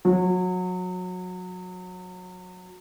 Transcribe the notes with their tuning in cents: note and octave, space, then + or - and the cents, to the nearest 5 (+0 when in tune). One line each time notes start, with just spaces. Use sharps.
F#3 -25